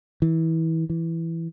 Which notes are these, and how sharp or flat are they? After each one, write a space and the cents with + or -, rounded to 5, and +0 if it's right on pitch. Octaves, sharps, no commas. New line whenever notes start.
E3 -25
E3 +5